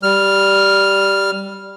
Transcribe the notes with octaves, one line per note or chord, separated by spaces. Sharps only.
G3 F6